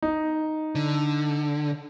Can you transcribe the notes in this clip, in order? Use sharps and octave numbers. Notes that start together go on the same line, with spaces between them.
D#4
D3